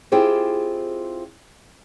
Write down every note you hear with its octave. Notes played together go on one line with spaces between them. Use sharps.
C4 E4 F4 G4 G#4 C5